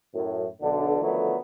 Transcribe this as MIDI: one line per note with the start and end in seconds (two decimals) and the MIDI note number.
0.14 0.45 42
0.14 0.45 45
0.62 1.01 35
0.62 1.01 50
1.01 1.36 50
1.01 1.36 51
1.01 1.36 53
1.01 1.36 54
1.01 1.36 57
1.01 1.36 59